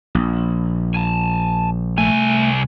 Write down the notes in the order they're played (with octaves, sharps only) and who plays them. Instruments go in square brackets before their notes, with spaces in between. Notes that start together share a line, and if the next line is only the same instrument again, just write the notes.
[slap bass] A#1
[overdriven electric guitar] G#5 A5
[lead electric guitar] C2 G#5 [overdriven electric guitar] A3